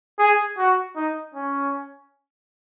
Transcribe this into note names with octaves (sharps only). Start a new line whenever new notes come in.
G#4
F#4
D#4
C#4